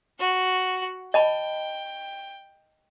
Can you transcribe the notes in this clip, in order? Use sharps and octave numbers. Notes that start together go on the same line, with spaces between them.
F#4 F#5
D#5 G5 A5 B5